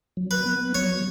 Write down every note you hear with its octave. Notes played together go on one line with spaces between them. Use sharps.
F#3
B4
B3
F#3 C#5